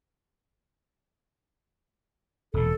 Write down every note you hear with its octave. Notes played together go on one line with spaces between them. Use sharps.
E1 A#2 A4